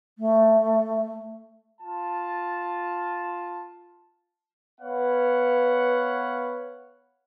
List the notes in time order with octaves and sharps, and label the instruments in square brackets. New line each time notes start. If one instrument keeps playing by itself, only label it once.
[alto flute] A3
[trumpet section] F4 A5
[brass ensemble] B3 B4 C#5 F5 F#5